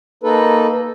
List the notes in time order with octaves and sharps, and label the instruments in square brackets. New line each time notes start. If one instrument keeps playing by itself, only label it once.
[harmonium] A#3 D#4 A4 B4